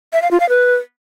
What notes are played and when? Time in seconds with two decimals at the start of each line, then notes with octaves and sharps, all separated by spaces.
0.13 E5
0.22 F5
0.31 F4
0.40 F5
0.49 B4